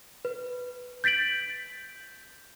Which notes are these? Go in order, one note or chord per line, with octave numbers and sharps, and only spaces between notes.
B4
G6 A6 B6 D7 F#7